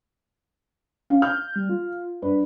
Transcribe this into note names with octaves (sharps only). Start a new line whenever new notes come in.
C#4 F5
F6 G6
G3
F4
G2 B4